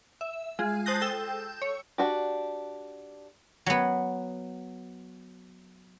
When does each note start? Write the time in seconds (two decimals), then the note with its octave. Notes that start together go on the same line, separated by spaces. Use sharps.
0.21 E5
0.59 G#3 F4 G#4
0.86 C5 A5 D#6 F#6 G6 A#6
1.02 A4 G5 E6 G6
1.62 C#5
1.98 D4 F#4 G4
3.66 F#3 B3